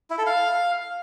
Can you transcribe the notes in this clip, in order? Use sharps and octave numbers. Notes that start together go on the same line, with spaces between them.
E4
A4
F5